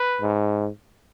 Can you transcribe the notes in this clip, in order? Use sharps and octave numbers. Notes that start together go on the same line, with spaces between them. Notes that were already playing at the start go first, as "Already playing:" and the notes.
Already playing: B4
G#2